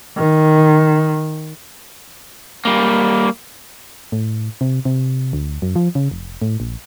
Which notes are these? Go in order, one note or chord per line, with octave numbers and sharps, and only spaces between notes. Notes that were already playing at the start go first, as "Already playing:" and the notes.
D#3
G3 A#3
A2
C3
C3
D2
F#2
F3
C#3
F1
A2
A#1